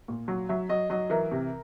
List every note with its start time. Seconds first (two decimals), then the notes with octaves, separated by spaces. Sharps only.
0.08 A#2
0.28 F#3
0.49 F#3 E5
0.69 F#3 D#5
0.90 F#3 D#5
1.10 E3 A#4
1.31 C3